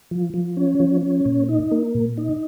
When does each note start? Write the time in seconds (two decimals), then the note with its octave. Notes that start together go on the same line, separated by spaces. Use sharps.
0.11 F3
0.34 F3
0.57 C#4
0.80 F3
1.03 C#4
1.25 A#2
1.49 D#4
1.71 A#3
1.95 A#2
2.18 D#4